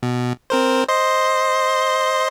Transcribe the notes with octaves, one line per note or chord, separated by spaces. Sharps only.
B2
C4 A#4 C5
C5 D#5 C6